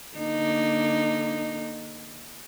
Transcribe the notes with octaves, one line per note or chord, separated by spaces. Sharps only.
D3 A#3 D#4